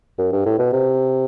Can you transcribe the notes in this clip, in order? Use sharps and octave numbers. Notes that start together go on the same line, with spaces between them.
F#2
G2
A2
B2
C3